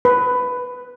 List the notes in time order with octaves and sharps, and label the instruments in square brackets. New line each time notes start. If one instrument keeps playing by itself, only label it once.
[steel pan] B4